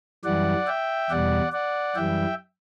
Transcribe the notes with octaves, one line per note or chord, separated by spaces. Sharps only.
F#2 E3 G3 D5 F#5
E5 G5
E2 B2 G3 D5 F#5
D5 F#5
F#2 E3 G3 E5 G5